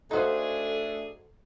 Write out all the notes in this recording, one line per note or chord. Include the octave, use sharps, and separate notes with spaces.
A3 D4 D#4 F#4 G#4 A4 C5 F5